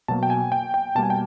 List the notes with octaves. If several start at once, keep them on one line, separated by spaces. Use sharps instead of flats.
B2 F#3 A#3 A5
G5
G#5
G5
G5
B2 G3 A#3 A5
G#5
G5